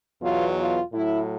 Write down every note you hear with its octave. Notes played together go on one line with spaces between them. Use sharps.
E2 B2 F#3 F4
F4
A2 F#3 E4